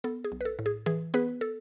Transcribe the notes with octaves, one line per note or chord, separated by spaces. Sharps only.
B3 A4
G#4
B1
B4
A4
A2
G#4
E3 G#4
B3 G#4 B4
A4